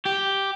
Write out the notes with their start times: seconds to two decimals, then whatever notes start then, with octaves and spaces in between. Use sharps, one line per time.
0.05 G4